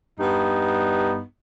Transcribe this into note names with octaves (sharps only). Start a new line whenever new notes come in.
G2 B3 D#4